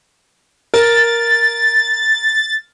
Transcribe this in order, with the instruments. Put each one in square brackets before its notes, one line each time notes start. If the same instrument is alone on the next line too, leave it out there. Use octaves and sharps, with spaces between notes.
[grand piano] A#4 [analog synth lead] A6